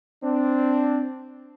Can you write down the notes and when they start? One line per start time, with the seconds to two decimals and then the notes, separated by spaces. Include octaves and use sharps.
0.23 C4 D4